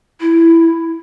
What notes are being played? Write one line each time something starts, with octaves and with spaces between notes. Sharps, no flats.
E4